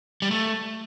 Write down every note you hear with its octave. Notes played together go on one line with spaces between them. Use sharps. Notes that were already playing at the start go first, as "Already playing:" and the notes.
G3
A3